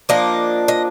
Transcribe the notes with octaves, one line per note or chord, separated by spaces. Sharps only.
F3 A#3 D4 D#5
D#5